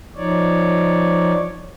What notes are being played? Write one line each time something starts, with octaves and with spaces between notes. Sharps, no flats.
F3 D#4 C#5 D5